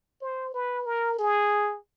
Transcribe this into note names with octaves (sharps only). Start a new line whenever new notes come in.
C5
B4
A#4
G#4